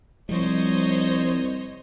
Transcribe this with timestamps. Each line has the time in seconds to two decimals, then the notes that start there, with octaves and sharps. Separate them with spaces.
0.29 C2 F3 G3 C5 C#5 D#5